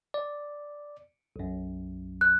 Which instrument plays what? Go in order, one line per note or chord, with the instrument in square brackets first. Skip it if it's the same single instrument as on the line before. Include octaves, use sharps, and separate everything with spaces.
[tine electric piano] D5
B1 F#2
[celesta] F#6